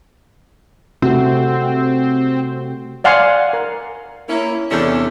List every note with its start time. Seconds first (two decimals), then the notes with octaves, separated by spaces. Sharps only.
1.02 C3 A3 C4 F#4
3.04 D5 F5 F#5 G#5 C6
3.53 A#4
4.29 A#3 C#4 E4
4.70 E2 C3 C#4 D4 A4 E5